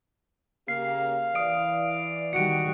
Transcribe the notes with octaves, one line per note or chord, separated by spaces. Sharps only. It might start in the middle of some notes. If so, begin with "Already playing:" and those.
C#3 A#3 G4 F5 C7
E3 D5 D#6 D7
D#3 G3 F#4 C#7 D7